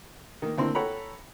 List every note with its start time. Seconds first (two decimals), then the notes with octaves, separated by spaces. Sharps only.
0.42 D#3 A#3
0.58 D2 A#3 C4 E4 C6
0.75 A4 C#5 F#5 G5 A#5 B5